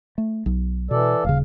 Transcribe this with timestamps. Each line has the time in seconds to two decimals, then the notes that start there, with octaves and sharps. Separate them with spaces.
0.18 A3
0.46 B1
0.91 B2 E3 A4 D5
1.24 D#1 C#3 F5